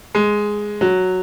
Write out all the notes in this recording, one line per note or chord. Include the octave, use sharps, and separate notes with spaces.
G#3
F#3